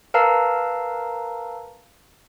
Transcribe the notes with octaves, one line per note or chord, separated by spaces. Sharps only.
A#4 B4 F5 A5 A#5 E6